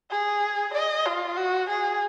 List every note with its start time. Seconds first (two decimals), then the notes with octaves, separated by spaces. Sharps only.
0.11 G#4
0.74 D#5
1.06 F4
1.37 F#4
1.70 G#4